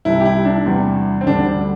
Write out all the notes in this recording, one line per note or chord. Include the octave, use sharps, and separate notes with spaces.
C2 C3 G3 E4
G4
E4
D4
E2 C3 E3 G3
C4
D2 D3 G3 D4